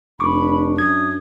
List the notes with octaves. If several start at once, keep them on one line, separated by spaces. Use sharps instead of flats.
F1 D4 B5 C#6 D6
F#2 D#6 G#6